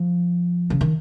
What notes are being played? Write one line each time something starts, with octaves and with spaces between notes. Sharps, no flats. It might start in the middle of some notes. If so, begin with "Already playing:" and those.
Already playing: F3
C#3
D#3